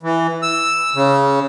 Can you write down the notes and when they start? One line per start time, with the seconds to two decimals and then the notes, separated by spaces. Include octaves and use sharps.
0.03 E3
0.42 E6
0.95 C#3